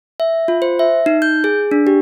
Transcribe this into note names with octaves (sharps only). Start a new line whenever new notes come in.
E5
F4
C5
E5
D#4
G6
G#4
D4
G4